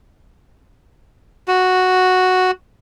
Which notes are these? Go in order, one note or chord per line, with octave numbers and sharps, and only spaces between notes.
F#4